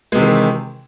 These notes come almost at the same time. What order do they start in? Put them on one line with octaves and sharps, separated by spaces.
G#3 C3 E3 D#3